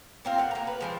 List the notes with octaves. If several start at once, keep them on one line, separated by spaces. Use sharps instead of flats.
A#3 C4 F4
A2 F#5
A#3 A#5
B4
E3 F3 G#3